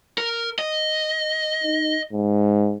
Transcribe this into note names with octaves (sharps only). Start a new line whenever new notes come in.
A#4
D#5
D#4
G#2